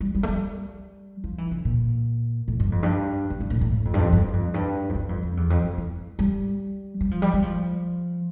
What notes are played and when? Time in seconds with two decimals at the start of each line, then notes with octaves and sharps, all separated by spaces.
0.01 G3
0.15 G3
0.23 A3
0.28 G3
1.24 F3
1.38 E3
1.51 D3
1.65 A#2
2.48 A2
2.60 G2
2.72 F2
2.83 G2
3.30 G2
3.41 G2
3.50 A2
3.61 A2
3.71 A2
3.85 F2
3.94 G2
3.99 F2
4.13 G2
4.33 F2
4.54 G2
4.89 F2
4.95 G2
5.09 F2
5.22 F2
5.37 E2
5.50 F2
5.63 F2
5.78 E3
6.19 G3
7.01 G3
7.11 F3
7.22 G3
7.34 G3
7.42 F3